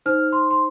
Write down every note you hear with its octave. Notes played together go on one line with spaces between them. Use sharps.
D#4 C5 F6
C6
C6